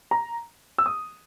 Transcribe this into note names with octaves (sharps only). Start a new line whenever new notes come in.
A#5
E6
D#6